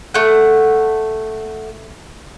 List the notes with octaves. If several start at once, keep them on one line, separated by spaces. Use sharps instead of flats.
A3 F#5